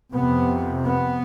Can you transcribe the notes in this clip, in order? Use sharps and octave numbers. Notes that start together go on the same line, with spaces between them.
F2 C3 B3
B3